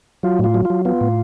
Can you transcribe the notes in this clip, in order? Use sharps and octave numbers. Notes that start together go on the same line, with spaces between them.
F#3 F4
A2 F4
F#3
F4
F#3
B3 F4
A2